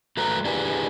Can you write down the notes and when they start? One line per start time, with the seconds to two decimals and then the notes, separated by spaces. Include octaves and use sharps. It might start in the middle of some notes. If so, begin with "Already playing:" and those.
0.17 F#3 A3 B4 A#5
0.45 D4 E4 G4 G#4 B4 D5